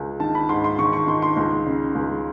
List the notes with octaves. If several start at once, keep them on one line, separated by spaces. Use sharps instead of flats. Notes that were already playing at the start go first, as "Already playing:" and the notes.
Already playing: C#2
D#3 A5
B5
G#2 C6
C6
D#3 C#6
C#6
D#3 C6
C6
C#2
C#3
C#2